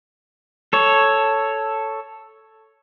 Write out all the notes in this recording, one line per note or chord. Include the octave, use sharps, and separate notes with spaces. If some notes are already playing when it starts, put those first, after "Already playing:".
A4 C#5